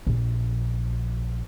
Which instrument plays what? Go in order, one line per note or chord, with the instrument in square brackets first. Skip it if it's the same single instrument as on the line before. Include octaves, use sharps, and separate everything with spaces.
[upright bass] A#1